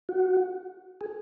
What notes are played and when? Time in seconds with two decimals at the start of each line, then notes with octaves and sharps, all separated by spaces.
0.09 F#4
1.01 G#4